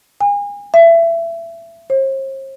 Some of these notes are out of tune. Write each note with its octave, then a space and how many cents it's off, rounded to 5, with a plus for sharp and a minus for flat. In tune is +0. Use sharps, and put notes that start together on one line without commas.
G#5 -35
E5 +25
C5 +45